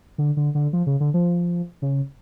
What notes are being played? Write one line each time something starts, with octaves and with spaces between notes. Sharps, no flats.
D3
D3
D3
F3
C#3
D3
F3
C#3